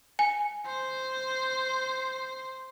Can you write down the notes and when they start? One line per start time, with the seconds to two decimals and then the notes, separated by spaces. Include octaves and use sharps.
0.19 G#5
0.66 C5